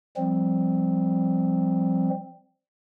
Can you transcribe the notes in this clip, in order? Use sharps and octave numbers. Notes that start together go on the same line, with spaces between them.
F3 G3 C4